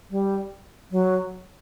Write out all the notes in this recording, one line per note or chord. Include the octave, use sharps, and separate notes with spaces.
G3
F#3